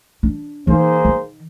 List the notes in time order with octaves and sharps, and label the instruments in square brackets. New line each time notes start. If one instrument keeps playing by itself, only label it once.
[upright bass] D4
[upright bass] E3 D#4 [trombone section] A#3 G#4 C5
[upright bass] D#3